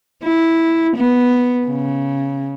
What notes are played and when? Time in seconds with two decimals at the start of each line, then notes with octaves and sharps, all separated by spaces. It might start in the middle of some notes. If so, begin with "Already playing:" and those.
0.23 E4
0.96 B3
1.67 C#3